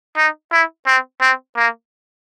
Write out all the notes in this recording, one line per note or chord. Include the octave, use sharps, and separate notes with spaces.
D#4
E4
C4
C4
A#3